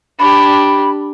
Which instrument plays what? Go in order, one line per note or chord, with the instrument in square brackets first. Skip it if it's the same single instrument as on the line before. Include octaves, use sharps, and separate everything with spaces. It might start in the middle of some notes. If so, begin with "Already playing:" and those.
[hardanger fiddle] D4 G4 [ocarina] B5